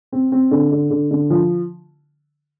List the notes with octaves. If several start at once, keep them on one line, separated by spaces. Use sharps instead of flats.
C4
C4
D3
D3
D3
D3
F3